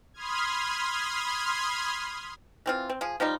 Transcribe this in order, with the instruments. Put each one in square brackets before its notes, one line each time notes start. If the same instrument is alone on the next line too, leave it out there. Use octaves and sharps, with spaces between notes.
[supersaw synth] B5 C6 D#6 F6 G#6
[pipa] E3 C4 F4
C4
F3 G#4
F3 G3 D#4 F4